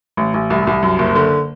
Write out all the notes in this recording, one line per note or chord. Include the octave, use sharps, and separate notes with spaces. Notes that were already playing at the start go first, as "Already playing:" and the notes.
A1
A1
C2
C2
F#2
F#1
D3